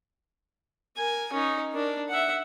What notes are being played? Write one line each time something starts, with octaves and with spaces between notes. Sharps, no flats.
A#4 G#5
C#4 D#4
D4 A#4
E5 F#5